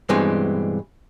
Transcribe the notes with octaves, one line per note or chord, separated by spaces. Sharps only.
G2 B2 E3 G#3 C4